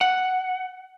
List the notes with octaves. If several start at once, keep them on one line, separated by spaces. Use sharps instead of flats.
F#5